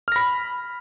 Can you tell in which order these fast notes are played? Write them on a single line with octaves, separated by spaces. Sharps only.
F6 A#6 B5